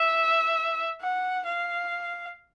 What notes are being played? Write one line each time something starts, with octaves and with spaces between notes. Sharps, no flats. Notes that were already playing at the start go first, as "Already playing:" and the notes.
Already playing: E5
F#5
F5